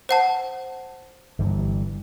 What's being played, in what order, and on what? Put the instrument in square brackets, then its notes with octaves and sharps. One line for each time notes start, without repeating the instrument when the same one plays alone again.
[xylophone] C5 F#5 A5
[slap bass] G1 G2 E3